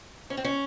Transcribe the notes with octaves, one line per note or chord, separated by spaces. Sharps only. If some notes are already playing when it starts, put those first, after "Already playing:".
C#4
C4
C#4